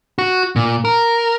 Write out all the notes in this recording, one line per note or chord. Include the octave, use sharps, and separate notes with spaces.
F#4
A#2
A#4